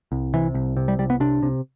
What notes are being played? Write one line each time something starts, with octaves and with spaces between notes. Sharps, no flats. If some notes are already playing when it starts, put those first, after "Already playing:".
C2
C3 E3
C2
C3
G3
C2 G3
B3
C3 D4
C3